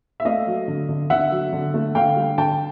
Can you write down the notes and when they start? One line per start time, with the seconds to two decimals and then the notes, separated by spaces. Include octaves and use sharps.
0.20 E5
0.25 A3 D#5 F5
0.47 F#3
0.68 D3
0.89 D3
1.10 D3 E5 F#5
1.32 F#3
1.53 D3
1.74 A3
1.95 D3 F5 G5
2.16 G3
2.38 D3 G5 A5